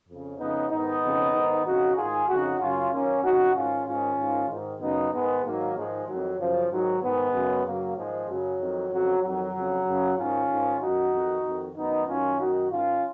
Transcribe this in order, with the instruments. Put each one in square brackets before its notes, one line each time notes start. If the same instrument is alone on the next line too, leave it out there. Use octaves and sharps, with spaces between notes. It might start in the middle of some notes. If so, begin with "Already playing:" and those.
[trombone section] F2 C#3
F2 C#3 B3 D#4
G#2 D#3 B3 D#4
F2 C#3
G#2 D#3
F2 C#3 D#4 F#4
G#2 D#3 F4 G#4
F2 C#3 D#4 F#4
F#2 C#3 C#4 F4
F#2 D#3 A#3 C#4
F2 C#3 D#4 F#4
G#2 D#3 C#4 F4
G#2 D#3 C#4 F4
G#2 D#3
G#2 D#3
F#2 C#3 B3 D#4
G#2 D#3 G#3 B3
G#2 D#3 F#3 A#3
G#2 D#3 F3 G#3
F2 D#3 F#3
F#2 C#3 F3
G#2 D#3 F#3
G#2 D#3 G#3 B3
F#2 C#3
F#2 C#3 F#3 A#3
G#2 D#3 F3 G#3
F#2 C#3 F#3
F2 D#3
F2 C#3 F#3
F2 D#3 F#3
F2 C#3
F#2 C#3
G#2 D#3 C#4 F4
G#2 D#3
F#2 D#3 D#4 F#4
F2 D#3
F2 D#3
F#2 D#3 B3 D#4
F#2 D#3 C#4 F4
F#2 D#3 D#4 F#4
G#2 D#3 C#4 F4